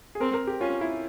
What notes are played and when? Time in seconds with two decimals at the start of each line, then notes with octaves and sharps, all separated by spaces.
0.15 G#4
0.20 C4 A#4
0.34 A#4
0.47 G4
0.60 C#4 F4
0.81 E4